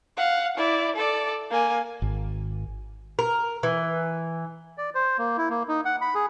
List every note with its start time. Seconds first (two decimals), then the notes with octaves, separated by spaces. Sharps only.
0.17 F5 F#5
0.57 E4 D5
0.96 A4 D5
1.50 A#3 G#5
2.02 G#1
3.19 A#4
3.63 E3
4.78 D5
4.95 C5
5.18 A#3
5.37 E4
5.50 A#3
5.68 D#4
5.85 F#5
6.02 B5
6.15 G#4